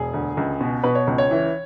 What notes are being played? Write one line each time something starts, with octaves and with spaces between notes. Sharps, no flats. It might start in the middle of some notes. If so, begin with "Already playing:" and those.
Already playing: E1 G#4
D2
C#2
B2
B2 B4
C#5
C#2
C#5
E3